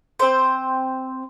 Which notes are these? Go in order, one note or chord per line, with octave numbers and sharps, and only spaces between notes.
C4 C5